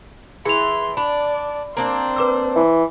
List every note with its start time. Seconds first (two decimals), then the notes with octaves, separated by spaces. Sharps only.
0.46 E3 G#4 B5 C6 F7
0.97 D4 D5 B5
1.77 A#3 C4 D4 C5
2.16 B4 D6 E6
2.56 E3